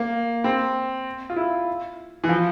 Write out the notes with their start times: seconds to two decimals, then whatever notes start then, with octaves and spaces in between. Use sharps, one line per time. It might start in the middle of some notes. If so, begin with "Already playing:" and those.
Already playing: A#3
0.44 C4
1.30 F4
1.36 E4
2.24 E3
2.29 F3